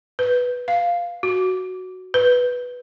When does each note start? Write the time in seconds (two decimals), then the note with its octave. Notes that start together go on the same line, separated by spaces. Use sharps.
0.19 B4
0.68 F5
1.23 F#4
2.14 B4